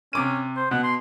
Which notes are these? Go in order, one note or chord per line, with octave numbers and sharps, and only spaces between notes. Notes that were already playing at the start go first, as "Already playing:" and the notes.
C3 C#4 D6 D#7
C5
B2 F#5
C6